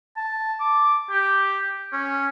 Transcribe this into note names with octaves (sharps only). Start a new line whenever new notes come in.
A5
D6
G4
C#4